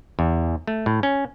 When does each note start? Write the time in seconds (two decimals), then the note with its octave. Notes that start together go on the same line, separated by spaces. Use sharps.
0.19 E2
0.67 A3
0.86 A2
1.03 C#4